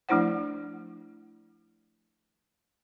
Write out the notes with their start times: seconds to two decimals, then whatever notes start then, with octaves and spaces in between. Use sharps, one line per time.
0.09 F3 A3 D4 E4 C5 F#5